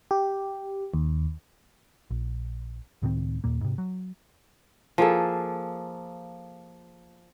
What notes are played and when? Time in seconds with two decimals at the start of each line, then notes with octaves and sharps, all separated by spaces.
0.11 G4
0.94 D#2
2.11 A#1
3.02 C#2 A2 D#3 C4
3.44 D#2 A#2 A#3
3.61 G#2 C3
3.78 F#3
4.98 F3 A#3 G#4 A4